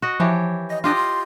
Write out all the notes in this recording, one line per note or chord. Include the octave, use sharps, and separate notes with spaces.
F#4 D#5
E3 F3 G4 C#5
D#5 A#6
D4 F4 G4 D#5
C6